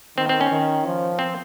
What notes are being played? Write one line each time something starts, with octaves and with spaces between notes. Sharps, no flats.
D#3 C4
C4
C#4
D#3
F3
C4